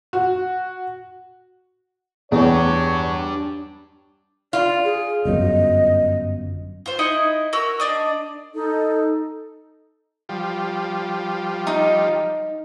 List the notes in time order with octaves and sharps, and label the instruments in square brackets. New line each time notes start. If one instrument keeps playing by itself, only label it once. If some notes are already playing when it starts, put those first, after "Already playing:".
[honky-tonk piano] F#4
[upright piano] E2 [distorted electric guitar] D4 G4 [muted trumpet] C#5
[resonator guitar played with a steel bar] F4 [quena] D5
[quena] G#4
[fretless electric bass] G1 F#2 [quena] D#5
[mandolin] F4 C5
D#4 E4 D#5
F#4 A#4 E6
D4 D5 D#5
[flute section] D#4 A4
[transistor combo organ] F3 G3
[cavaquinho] D#4